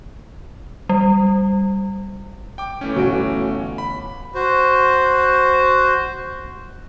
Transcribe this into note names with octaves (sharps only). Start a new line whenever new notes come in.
G3
G5 D6
E3 A3 C#4
G1 F#4 D7
B5
F#4 C5